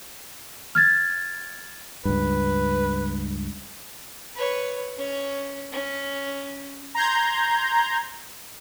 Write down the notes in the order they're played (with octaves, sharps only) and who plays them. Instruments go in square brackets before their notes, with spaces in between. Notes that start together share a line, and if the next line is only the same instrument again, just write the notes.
[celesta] F6 G#6 A6
[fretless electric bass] C#2 G2 [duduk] B4
[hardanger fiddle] B4 C#5
C#4 C#5
C#4
[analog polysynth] A#5 C6 G6 G#6